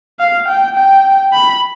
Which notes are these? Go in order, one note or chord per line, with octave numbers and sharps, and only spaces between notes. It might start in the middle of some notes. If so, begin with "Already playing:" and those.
F5
G5
G5
B5